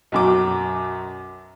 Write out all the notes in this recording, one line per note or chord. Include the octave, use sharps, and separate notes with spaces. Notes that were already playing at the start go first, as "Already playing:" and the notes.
B1 F#2 D6